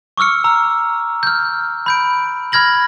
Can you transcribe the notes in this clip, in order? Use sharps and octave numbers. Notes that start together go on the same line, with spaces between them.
C#6 D6 E6 F6 C#7
A#5 E6
F6 G6
B5 G6 D7
B5 F6 G#6 A#6 F#7